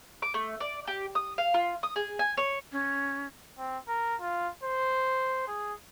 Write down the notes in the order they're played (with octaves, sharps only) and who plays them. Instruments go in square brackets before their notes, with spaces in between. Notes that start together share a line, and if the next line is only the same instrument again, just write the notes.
[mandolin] D6
A3
D5
G4
D#6
F5
F4
D#6
G#4
G#5
C#5
[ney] C#4
[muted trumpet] C4
A#4
F4
C5
G#4